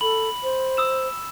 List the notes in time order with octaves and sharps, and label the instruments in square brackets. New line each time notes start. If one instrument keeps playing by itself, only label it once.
[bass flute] A4 [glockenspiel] B5 F#7
[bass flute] C5
[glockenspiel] D#6 E6 E7